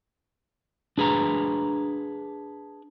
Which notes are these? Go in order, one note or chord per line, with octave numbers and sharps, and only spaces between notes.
D4 G#4 B4 A#5